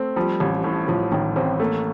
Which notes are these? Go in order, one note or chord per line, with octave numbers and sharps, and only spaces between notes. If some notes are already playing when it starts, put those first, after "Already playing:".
Already playing: A3 C4
F3 G3
A1
A2
A1 F3
A1 D#3
A1 C4
A3 A#3